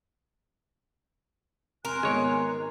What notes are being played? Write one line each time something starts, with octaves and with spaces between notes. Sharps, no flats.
F2 A#4 G#5 C6 F#6
G#1 G#3 B3 C#5